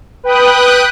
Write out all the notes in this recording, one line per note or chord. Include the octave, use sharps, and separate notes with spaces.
B4 G5 D#6 F#6